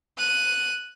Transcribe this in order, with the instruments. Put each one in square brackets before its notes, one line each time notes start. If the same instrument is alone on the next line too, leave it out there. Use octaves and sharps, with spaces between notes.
[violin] F#6 D#7